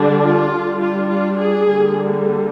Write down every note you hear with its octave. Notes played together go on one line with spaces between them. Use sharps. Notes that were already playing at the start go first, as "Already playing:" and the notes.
Already playing: D3 G3 D4
F4
G3 D4
F4
F4
G#4
D3 G3 A#3